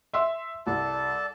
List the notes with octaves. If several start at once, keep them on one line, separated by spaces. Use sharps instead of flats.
E5 C6 E6
C2 A4 D5 A5